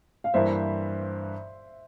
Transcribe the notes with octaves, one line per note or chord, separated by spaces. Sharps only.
F5
G2 E3 A#3 C5 E5